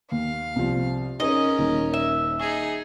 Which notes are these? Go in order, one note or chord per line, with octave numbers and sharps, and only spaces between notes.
D#2 F5
C2 F3
C#4 D#4 G#4 A#4 C#5 D#5
D#1 D#4
E5
D#4 G#4